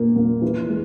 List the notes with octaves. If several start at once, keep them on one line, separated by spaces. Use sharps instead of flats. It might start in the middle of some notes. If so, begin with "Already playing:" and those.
Already playing: A#2 A#3
A#2
E3
G#3